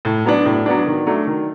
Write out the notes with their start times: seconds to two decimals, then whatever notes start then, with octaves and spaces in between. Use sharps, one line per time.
0.05 A2
0.25 F#3 B3 D4
0.45 A2
0.66 F#3 B3 D4
0.86 D#3
1.06 F#3 A3 D4
1.27 D#3